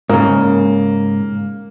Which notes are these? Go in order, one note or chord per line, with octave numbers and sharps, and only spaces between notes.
G#2 C#3 A#3